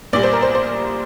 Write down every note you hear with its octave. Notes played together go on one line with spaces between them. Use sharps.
A#1 A#2 G3 D5
C5
A#4
C5
C5